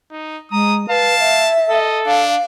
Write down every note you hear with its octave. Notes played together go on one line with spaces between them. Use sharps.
D#4
G#3 A#5 D#6
B4 F5 A5
E5
A4 D#5
D4 F5